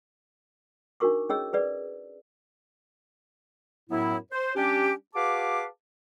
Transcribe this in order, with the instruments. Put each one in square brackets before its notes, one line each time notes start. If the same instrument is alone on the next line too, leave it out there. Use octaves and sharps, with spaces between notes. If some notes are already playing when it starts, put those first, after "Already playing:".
[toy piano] D4 D#4 F#4 A#4 C#6 D6
C#4 G#4 C#5 D#5 E6
G#4 B4 D5
[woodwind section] F#2 A2 F#3 B3 E4
C5
G3 C#4 D4 G4
F#4 G#4 B4 F5 A5 D6